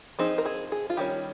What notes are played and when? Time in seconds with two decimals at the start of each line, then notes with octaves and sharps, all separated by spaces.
0.19 F3 C4 D#4 G#4
0.38 A#4
0.46 G#4
0.72 G#4
0.90 F4
0.97 D#3 G3 C#4 G4